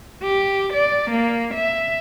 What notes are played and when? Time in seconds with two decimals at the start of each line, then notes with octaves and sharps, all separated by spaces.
0.22 G4
0.73 D5
1.11 A#3
1.54 E5